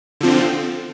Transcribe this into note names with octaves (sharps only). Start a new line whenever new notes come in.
D3 F3 C4